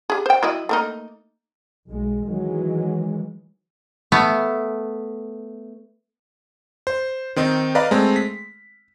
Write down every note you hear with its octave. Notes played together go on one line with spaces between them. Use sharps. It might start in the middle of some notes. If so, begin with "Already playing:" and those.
G4 G#4
C5 G5
F#3 E4 D#5
A3 A#3 D#4
B1 G#3
D#3 E3 F#3 G#3
A3 B3
C5
D#3 C4 D#4
B4 D5 D#5 F5 A#5 B5
G#3 A3 C4
B6